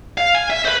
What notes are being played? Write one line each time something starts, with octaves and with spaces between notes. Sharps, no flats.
F5
G#5
E5
B4 C5